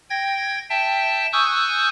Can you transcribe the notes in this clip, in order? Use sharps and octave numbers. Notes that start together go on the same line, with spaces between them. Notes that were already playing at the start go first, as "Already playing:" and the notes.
G5 G#6 A#6
E5 G5 A5
G#5 C#6 D#6 E6 F#6 G6